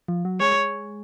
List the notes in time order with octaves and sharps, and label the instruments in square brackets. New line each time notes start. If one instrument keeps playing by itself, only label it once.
[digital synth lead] F3
F#3
[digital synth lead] G#3 [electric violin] C#5